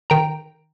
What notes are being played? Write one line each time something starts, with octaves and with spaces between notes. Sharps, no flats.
D#3 G5 A#5